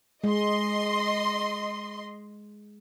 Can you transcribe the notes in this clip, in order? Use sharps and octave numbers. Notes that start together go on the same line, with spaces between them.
G#3 D#5 C6